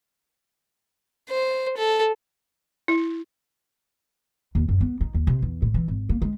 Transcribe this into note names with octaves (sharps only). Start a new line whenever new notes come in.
C5
A4
E4
D#2
F#2
B3
D#4
D#2
C3
E2
A2
E3
G#1
A#3
G#3